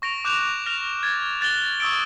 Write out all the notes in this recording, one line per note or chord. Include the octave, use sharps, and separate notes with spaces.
C#6 A#6 D7 F7
D6 F#6 G6 E7 F7
F6 A#6 F7
G#6 A6
F#6 A6 F#7 G7
C#6 D#6 E6 A6 D7